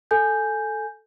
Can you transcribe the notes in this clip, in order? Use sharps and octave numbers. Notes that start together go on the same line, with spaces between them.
A4 G#5 G6